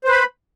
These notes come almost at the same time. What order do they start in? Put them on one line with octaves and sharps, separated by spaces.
C5 B4 B5